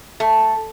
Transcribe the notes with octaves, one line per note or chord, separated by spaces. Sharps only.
A3